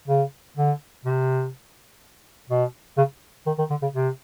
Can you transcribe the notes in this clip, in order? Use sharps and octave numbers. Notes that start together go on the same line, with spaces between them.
C#3
D3
C3
B2
C#3
D#3
D#3
D3
C#3
C3